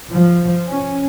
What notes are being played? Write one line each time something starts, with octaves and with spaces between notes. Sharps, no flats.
F3
C#4